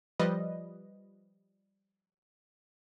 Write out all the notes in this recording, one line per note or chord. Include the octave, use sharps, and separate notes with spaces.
F3 G3 B4 D#5